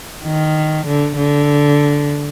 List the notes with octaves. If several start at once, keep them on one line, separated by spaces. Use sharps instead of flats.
D#3
D3
D3